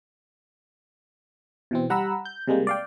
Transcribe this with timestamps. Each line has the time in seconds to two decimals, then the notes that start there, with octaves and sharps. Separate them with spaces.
1.71 B2 E3 C4
1.90 G3 F#5 A#5 B5 E6
2.25 G6
2.48 C3 G3 G#3 A#3
2.67 D5 F5 G5